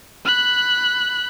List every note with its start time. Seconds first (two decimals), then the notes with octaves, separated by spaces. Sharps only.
0.25 B5 F#6